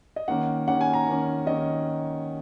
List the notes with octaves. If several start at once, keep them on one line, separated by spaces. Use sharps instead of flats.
D#5
D#3 A#3 C#4 F#5
D#3 A#3 C#4 F#5
G#5
A#5
D#3 A#3 C#4
D#3 A#3 C#4 D#5